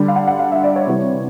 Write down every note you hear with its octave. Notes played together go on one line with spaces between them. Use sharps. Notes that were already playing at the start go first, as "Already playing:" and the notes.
Already playing: D3 G3
F5
F#5
F#5
F5
E5
D5
C#5
C3 E3 G3